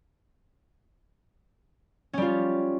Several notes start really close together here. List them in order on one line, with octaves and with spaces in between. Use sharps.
C#4 G3 F4